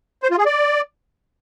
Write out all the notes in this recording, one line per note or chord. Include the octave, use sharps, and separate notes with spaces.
C5
F4
G#4
D5